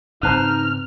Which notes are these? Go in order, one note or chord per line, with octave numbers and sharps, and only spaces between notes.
G#2 C#3 C4 D#4 B4 C5 A5 F6